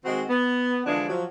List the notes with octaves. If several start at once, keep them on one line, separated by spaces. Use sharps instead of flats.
D#3 G#3 C4 F#4
B3
D3 E3 F3 G#3 D4
F3 F#3